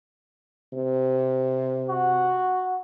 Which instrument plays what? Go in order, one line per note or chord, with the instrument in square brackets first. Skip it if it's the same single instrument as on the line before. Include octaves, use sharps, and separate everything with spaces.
[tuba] C3
[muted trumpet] F#4